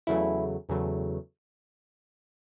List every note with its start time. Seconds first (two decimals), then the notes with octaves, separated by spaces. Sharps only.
0.07 E2 C#3 F#3 A3 E4
0.69 E2 C#3 F#3 A3